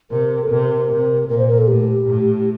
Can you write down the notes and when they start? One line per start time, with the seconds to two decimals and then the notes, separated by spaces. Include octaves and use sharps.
0.11 C3 A#4
0.43 A4
0.50 C3 A#4
0.90 C3
1.28 A#2 A#4
1.38 C5
1.48 A#4
1.58 A4
1.67 A2 G4
2.07 A2